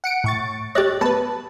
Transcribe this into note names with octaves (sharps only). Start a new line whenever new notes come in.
F#5 C#7 D7
A2 C#6 A6
G4 C#5 D#5 F#6 A6
B3 B4 A5